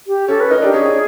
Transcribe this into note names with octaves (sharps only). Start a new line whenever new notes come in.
G4
C#4 A4
B4
D#4 A#4
D4 G4
C#4 G#4
C#4